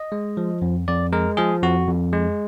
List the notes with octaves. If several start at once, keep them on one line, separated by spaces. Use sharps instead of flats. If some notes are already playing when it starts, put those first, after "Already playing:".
Already playing: D#5
G#3
F3
F2
F2 D5
G#3 A#4
F3 G#4
F2 F#4
F2
G#3